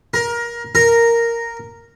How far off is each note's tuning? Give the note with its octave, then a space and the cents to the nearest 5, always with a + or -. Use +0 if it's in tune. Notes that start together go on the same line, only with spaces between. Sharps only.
A#4 +20
A#4 -5